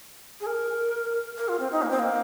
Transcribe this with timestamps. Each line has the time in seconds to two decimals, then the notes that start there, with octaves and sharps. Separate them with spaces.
0.41 G#4
0.46 A#4
1.37 A#4
1.48 F4
1.60 C4
1.72 D#4
1.82 A#3
1.91 C4
1.99 A#3